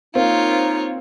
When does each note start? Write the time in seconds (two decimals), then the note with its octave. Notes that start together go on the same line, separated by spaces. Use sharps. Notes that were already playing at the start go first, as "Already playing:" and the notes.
0.15 A#3 C4 D#4 F4 C#5